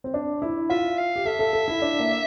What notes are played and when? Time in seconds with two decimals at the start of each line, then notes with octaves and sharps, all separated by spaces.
0.04 C4
0.14 D4
0.42 E4
0.70 F4 E5
0.98 F5
1.16 G4
1.25 A4 E5
1.39 A4
1.53 A4
1.68 E4
1.82 D4
2.00 A#3